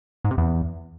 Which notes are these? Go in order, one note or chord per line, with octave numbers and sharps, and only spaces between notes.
G#2
C3
E2